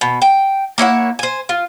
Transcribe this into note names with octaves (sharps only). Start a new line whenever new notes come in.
B2
G5
A#3 E4 C#5 F#5
C5 G#5
F4